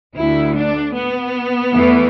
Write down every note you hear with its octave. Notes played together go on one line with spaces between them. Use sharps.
D2 D3 A3 E4
D4
B3
E2 E3 A3